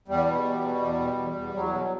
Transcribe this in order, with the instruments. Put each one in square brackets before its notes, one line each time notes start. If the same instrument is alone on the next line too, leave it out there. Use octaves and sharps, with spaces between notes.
[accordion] E2 G3
B2
E2
B2
E2
B2
E2
E2
E2 F#3
B2